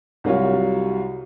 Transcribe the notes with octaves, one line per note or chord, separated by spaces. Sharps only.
C2 F#3 G3 F4 C#5